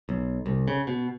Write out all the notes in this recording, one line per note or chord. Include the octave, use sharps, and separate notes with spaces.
B1
C2
C#3
B2